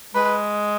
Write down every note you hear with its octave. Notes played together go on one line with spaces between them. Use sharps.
G#3 B4